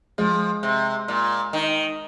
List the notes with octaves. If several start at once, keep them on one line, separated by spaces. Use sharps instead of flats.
F3 G#3
C3
A#2
D#3